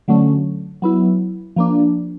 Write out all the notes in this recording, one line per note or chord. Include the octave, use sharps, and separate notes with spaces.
D3 F#3 A3 C#4
F#3 B3 E4
F3 A#3 D4